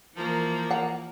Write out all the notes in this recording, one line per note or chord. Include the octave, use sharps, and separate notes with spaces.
E3 F3 A#3
F#5 A#5